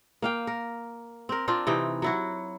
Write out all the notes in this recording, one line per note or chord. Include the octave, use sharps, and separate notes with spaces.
A#3 F5 G5
A#4
C4 A#4
C4 D4 F4
C3 E3 D#4 G5
F#3 E4 F#4